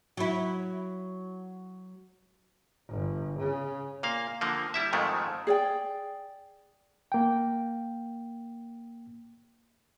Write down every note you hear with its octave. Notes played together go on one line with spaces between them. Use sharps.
F#3 E4
G1
C#3
A#2 A#3 F5
D3 F3 A#3
G3 E4 E5
F2 G#2 D#3 F3 G#3 A3
G#4 D5 G5
A#3 G5